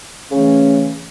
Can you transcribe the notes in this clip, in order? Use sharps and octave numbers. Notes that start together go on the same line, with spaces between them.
C#3 E3 A3 C#4